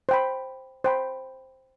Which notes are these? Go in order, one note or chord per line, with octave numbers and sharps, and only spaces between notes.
C5 G5 B5
C5 G5 B5